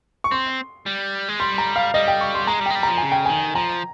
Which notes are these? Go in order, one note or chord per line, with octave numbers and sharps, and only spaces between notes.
C#6
C4 C6
G3
G#3
G3 C6
A#5
F5
G3 D#5
G5
C#6
C6
G#3 A#5
G3
G#3 G5
G3
F3 A#5
C#3 G#5
G5
D#3 G#5
F3 A#5